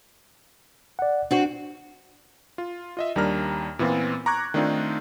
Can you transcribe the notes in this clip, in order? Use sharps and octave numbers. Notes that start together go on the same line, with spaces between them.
D5 F#5
C4 D4 F#4
F4
F4 D#5 E5
D#2 G3 D4 A#4 A#5 F6
A#2 E3 B3 C4 F4
A#5 C#6 D6 F#6 G#6
D#3 A3 C4 D4 D#4 F4